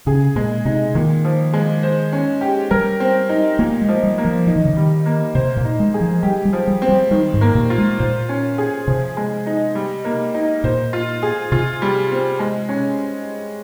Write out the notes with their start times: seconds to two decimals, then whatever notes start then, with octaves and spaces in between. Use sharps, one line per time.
0.07 C#3 G#4
0.36 A#2 G#3
0.65 C3 D#4
0.95 A#2 D#3
1.25 F3
1.53 G#3
1.83 C5
2.12 C#4
2.41 G4
2.71 G3 A#4
3.00 C4
3.29 D#4
3.59 A#2 A#3
3.81 G#3
3.88 F3
4.03 G3
4.18 A#3
4.25 F3
4.47 F3 D#4
4.56 D#3
4.65 C#3
4.74 D#3 G3
5.06 A#3
5.35 C3 C5
5.57 A#2
5.65 D#4
5.80 G#3
5.94 G#4
6.01 F3
6.23 G3 G4
6.45 G3
6.53 F3
6.67 G3
6.82 C4
6.89 G3
7.11 D#3 G3
7.34 G#2
7.41 A#3
7.55 A#2
7.70 F4
7.78 G#3
7.99 A#2 C5
8.29 C#4
8.58 G#4
8.88 C3 F3
9.17 G#3
9.47 D#4
9.75 G3
10.05 A#3
10.34 D#4
10.64 A#2 C5
10.93 F4
11.23 G#4
11.52 C3 F4
11.82 G3
12.11 C4
12.39 G#3
12.69 C#4